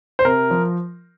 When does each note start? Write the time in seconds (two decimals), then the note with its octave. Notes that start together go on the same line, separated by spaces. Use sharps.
0.19 C5
0.25 C3 A#4
0.51 F3